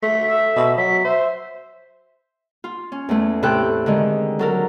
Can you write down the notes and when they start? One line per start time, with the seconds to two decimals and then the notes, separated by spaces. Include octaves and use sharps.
0.03 A3 B6
0.27 E5
0.56 B2
0.77 F#3 B6
1.04 C5 E5
2.64 F4
2.92 C#4
3.09 E2 A3
3.43 A2 C3 C4 A4 G5 F#6
3.86 D3 D#3 G#3
4.39 F#3 A4 A#4